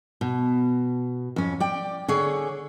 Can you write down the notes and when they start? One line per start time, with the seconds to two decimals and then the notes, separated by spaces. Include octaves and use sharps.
0.21 B2
1.36 F2 C#4
1.60 D5 G5
2.08 D3 G#4 C#5